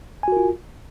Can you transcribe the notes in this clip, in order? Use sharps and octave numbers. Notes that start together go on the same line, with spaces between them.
F4 F#4 A#4 G#5